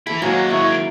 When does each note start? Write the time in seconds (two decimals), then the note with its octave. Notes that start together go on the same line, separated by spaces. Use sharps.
0.07 E3 E4 A4
0.22 D#3 F#3 G#3 A#3 C#4 F#4 F#5
0.48 E4 F#4 C#6
0.71 D7